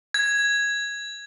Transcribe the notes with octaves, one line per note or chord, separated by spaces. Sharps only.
G#6